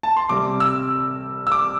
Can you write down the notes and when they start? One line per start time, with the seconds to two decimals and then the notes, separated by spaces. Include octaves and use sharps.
0.03 A5
0.17 C6
0.29 C3 G3 C4 D6
0.60 E6
1.47 E6
1.52 D6